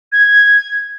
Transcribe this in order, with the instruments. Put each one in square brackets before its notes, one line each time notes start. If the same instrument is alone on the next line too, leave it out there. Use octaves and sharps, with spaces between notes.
[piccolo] G#6